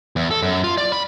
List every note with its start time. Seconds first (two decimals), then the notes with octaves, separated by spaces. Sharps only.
0.16 E2
0.31 A4
0.42 F#2
0.64 F4
0.78 D5
0.92 B5